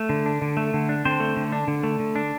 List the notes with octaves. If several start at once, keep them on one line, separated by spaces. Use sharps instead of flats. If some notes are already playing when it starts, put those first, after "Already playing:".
Already playing: A3
D3
D4
D3
A3
D3
D4
D3 C4 C5
A3
D3
D4
D3
A3
D3
D4